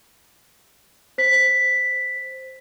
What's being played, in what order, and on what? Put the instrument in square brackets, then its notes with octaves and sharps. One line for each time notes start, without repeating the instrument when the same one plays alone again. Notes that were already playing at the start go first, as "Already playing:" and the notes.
[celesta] C5 B6